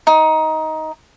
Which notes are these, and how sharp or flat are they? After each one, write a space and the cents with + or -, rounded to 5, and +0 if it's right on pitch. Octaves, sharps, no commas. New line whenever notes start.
D#4 +15